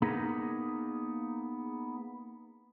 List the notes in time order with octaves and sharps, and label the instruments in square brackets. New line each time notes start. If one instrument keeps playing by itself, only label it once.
[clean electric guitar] A#3 B3 D#4 G#4 A#4